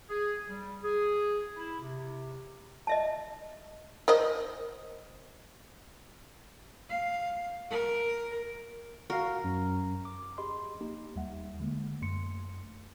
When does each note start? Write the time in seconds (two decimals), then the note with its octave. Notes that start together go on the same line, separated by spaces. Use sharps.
0.08 G#4
0.49 G3
0.84 G#4
1.57 E4
1.81 C3
2.87 D#5 E5 A5
4.08 A#4 C5 D#5
6.90 F5
7.70 A#4
9.10 F#4 A#4 F5
9.44 F#2
10.05 D6
10.38 G4 G#4 D#5 B5 C6
10.81 A#3 D#4 G4
11.16 D#2 G3 E5 F#5
11.60 D3 G#3 A#3
12.02 F#2 A3 C6 C#7